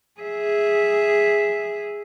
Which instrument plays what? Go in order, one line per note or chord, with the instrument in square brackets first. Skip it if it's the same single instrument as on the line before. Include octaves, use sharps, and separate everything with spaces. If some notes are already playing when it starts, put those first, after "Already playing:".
[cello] G#4 E5